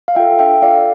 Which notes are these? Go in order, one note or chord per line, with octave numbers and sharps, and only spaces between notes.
F5
F4 A4 E5 G5
D4 E5 G5
F4 A4 D5 F5